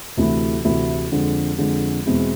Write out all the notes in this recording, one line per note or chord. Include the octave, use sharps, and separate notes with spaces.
D2 C3 E3 A3 E4
D2 C3 E3 A3 E4
F2 D3 G#3
F2 D3 G#3
E2 B2 G#3 C4 E4